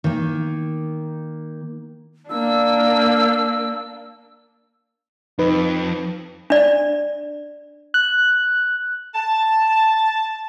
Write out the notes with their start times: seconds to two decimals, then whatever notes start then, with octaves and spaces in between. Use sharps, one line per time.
0.04 D#3 A#3
2.30 A#3 D4 E6
5.39 F2 D#4 B4
6.50 D4 D5
7.94 F#6
9.15 A5